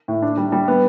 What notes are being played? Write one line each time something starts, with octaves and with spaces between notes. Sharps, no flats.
A2
D4
G3
G3
B3